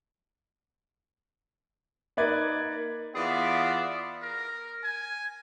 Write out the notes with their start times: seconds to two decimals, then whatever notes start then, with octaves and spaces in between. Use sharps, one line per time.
2.17 A#3 D#4 B4 D5 G#6
3.15 E3 B3 F4 G#4 D5 E5
4.23 A#4
4.84 G#5